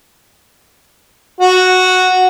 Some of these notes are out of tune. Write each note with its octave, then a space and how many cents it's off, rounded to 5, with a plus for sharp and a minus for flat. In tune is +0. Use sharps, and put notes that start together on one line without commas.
F#4 -5